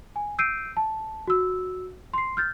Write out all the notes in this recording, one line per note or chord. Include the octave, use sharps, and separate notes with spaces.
G#5
E6 G6 C7 D7 D#7
A5
F#4 E6
C6 C7
F6 G6 A6